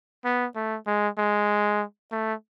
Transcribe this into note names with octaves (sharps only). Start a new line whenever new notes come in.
B3
A3
G#3
G#3
A3